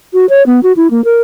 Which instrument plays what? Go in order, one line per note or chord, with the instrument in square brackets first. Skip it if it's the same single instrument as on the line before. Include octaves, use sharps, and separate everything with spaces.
[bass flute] F#4
C#5
B3
F#4
E4
A#3
A#4